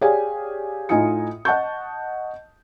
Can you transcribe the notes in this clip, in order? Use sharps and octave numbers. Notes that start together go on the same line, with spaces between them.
G4 G#4 C#5 D5 F5 G#5
A2 D#4 F4 G#5 D#6 C#7
D#5 F#5 A5 C#6 G6